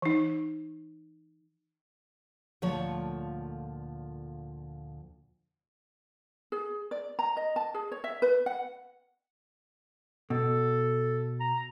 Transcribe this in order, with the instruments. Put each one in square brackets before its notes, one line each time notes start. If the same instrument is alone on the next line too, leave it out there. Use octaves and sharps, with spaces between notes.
[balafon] E3 D#4
[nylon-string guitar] D2 A#2 F3 A4 C#5 F#5
[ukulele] G#4
D5
A#5
D#5
A5
G#4
C#5
E5
B4
F#5
[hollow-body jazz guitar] B2 [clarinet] A4
[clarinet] A#5